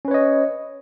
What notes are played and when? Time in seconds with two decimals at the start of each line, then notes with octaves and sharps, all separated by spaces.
0.05 C#4
0.08 B4
0.11 C#5
0.14 D#5